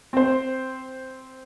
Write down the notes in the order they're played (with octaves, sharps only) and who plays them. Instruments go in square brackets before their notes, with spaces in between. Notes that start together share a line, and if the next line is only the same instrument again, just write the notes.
[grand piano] C4 C5